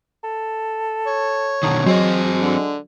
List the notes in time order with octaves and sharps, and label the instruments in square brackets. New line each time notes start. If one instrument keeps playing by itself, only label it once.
[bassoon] A4
[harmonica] C#5
[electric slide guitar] B2 D3 D#3 [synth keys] A5 A#5 D#6
[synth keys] F#3 F#4 [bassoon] G#3 [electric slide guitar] C4 C5 D#5
[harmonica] D3